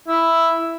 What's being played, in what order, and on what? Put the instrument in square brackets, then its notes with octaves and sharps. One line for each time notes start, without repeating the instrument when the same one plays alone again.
[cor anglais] E4